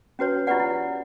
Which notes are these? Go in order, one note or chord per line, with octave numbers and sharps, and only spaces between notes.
C#4 F#4 B4 C#5
E4 F4 G4 B4 D5 F#5
E4